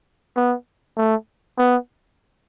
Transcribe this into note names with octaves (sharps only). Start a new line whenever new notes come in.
B3
A3
B3